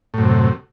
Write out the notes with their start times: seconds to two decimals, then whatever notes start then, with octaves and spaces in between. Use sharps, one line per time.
0.14 A2
0.18 F#2
0.22 C3